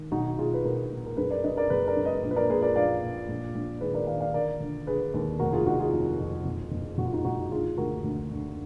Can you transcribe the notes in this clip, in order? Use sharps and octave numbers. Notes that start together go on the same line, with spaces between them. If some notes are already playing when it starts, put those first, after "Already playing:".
Already playing: D#3
B1 D#4 F#4
B1 F4 G#4
B4
B1 F#4 A#4
A#2
A#4
F#2 G#4 B4
A#4 D5
F#2 B4 D#5
A#4 D5
F#1 G#4 B4
A#4 D5
F#2
B4 D#5
A#1
B4
A#4 D5
A#2 G#4 B4
A#4 D5
A#1 D5 F5
A#2
A#1
A#1
D#3 G#4 B4
A#4 D5
D#3 D5 F5
D5 F5
D3 A#4 D5
D3
D3 G#4 B4
D#2
F1 F#4 A#4
F4 G#4
F2 D#4 F#4
F4 G#4
F2
F2
F#1
F#1
F#1 F#4
F4
D#4 F#4
F#1 D#4 F#4
D3 F4 G#4
D2 F#4 A#4
D2
D3